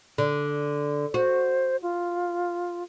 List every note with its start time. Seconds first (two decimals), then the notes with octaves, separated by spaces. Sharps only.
0.18 D3
1.14 F#4 C5
1.82 F4